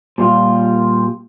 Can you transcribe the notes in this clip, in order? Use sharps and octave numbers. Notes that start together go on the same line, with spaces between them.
A#2 G3 F4